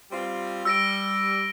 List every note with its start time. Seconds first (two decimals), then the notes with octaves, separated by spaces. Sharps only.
0.12 G3 C4 F4
0.65 G3 E6 A#6 D7